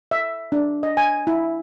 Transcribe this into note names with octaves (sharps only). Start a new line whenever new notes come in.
E5
D4
D#5
G#5
E4